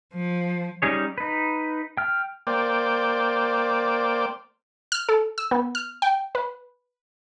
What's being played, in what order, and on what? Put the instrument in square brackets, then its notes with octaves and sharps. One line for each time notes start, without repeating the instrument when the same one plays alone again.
[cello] F3
[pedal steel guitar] G3 C#4 D#4 G#4 C#5
D#4 B4
G5 F6
[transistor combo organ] A#3 C5 D5 G5
[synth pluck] F6
A4
E6
B3
F6
G5
B4